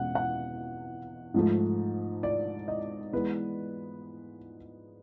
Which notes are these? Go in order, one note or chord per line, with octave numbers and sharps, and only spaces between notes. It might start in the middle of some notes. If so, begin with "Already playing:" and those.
Already playing: E2 B2 G#3 C#4 F#5
F#5
G#2 F3 A3
D5
D#5
E3 G#3 B3 B4